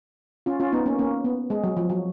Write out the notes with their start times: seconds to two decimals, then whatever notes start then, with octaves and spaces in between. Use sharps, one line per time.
0.46 C#4 F4
0.60 C#4 F4
0.72 B3 D#4
0.86 A#3 C#4
0.99 A#3 C#4
1.25 B3
1.50 G#3
1.64 F#3
1.77 F3
1.90 F#3